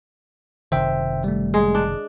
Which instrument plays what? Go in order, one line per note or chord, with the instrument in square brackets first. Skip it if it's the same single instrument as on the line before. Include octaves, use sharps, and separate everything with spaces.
[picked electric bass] F#1 C3 D#3 [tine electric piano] C5 E5 G5
[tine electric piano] G3 A3
[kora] G#3
D4